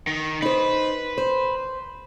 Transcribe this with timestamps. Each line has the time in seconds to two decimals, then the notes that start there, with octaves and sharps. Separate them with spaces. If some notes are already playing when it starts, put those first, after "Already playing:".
0.07 D#3
0.42 D#4 B4 C5
1.18 C5